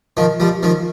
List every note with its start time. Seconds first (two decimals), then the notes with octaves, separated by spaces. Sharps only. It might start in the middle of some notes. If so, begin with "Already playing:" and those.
0.17 D#3 F3
0.40 F3 G3
0.63 D#3 F3